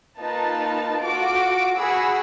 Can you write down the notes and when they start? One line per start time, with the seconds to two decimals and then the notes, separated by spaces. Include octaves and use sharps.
0.19 A#3 D#4 F4 B4 A5
1.02 F4 F#4 A4 D6 D7
1.77 F#4 G#4 F#5 B5 E6